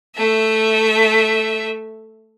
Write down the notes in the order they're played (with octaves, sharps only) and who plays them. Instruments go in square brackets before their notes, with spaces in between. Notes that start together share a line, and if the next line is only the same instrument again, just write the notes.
[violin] A3 E5